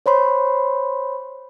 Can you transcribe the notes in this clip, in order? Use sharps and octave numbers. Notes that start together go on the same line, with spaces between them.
C5 C#5 B5 C6